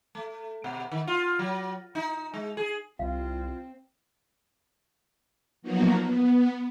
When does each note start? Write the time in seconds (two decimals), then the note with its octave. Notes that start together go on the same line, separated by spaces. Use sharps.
0.15 A3
0.64 B2
0.92 D#3
1.07 F4
1.39 F#3
1.95 D#4
2.34 G#3
2.57 G#4
2.99 C2 C4 F4 F5
5.62 F3 F#3 A#3 B3 D#4 F#4
6.04 B3